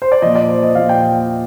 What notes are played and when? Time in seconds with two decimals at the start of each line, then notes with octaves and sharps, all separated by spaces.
0.02 C5
0.12 D5
0.22 A#2 F3 D#5
0.35 D5
0.49 C5
0.63 D#5
0.75 A#2 F3 F5
0.89 G5